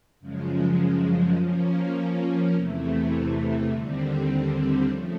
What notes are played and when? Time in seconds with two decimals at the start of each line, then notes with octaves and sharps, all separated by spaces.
0.20 F#2 C#3 F3 G#3
1.36 F3 A#3 C#4
2.53 E2 C3 E3 A3
3.70 D#2 D3 G3 C4
4.87 C#3 F3 A3